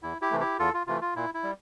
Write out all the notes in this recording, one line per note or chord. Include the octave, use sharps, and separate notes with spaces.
E2 E4
E4 G4
C3 E3 A3
E4 G4
E2 F4 A4
F4
C3 E3 A3 F4
F4
A#2 E4
E4
G3